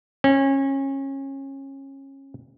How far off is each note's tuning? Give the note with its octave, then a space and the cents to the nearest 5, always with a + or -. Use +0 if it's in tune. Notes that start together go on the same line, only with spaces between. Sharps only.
C#4 -25